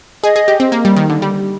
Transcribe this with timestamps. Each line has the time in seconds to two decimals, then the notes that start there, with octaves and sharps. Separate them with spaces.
0.24 G#4 D#5
0.36 G#4
0.48 G4
0.60 C4
0.72 A#3
0.85 G3
0.97 D#3
1.10 D3
1.22 G3